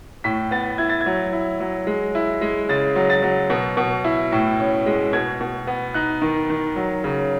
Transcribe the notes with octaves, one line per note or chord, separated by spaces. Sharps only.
A2 B6
B3 A6
E4 G#6
A6
G#6
F#3
E4
F#3
G#3
E4
G#3
C#3 A6
F#3
A6
F#3
B2
B2
E4
A2
C#4
G#3
B2 G#6
B2
B3
D#4 F#6
D#3
D#3
F#3
C#3